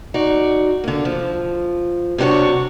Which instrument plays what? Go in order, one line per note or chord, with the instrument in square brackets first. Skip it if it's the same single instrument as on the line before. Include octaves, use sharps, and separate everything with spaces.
[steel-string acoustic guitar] D#4 F#4 D5
D3 A#3
F3
C3 G3 D4 F#4 C#5